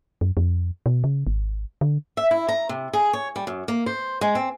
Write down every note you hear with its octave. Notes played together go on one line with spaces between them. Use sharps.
F#2
F2
B2
C#3
G#1
D3
E5
E4
A#5
C3
G#4
C#5
G3
F#2
A#3
C5
G#3
C4